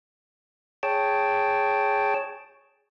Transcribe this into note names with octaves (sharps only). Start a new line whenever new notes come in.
G#4 C#5 G5 A5